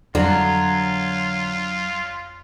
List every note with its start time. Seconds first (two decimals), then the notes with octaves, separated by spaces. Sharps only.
0.15 F2 D3 F#3 F4